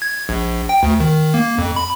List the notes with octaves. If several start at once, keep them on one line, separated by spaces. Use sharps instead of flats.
G#6
A#1
G5
D2
D#3
A#3
F2
B5